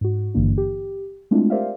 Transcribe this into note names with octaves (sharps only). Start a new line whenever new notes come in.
G#2 F#4
G#1 G2 D3 E3 A#3 D4
G4
G#3 A3 C4 D4 E4 F4
G4 A#4 C5 D5 E5 F5